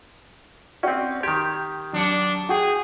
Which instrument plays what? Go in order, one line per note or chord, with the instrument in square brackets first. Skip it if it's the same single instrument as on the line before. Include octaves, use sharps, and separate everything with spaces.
[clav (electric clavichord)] C4 C#4 [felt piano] F#4 D5 G5
[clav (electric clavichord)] D#3 G4 [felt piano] C6 G#6
[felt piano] F#3 C#7 [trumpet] D4
[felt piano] F#4 G5 [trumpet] G#4